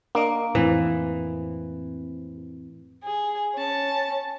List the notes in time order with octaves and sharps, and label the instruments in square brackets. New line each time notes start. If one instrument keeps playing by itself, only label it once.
[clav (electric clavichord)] A#3 [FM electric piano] D4 A#4 D#5
[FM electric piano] F2 A2 C4 [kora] E3
[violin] G#4
C#4 A5